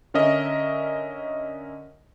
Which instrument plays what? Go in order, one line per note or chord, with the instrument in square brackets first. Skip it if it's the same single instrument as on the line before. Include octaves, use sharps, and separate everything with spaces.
[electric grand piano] D3 C#4 A#4 D#5 E5